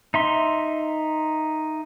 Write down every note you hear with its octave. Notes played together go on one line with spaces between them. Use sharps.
D#4 E5 C6